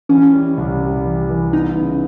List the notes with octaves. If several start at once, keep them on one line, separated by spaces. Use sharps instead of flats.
E3 C#4
G3
C2
G3
E3
E3
B3 D#4
C#3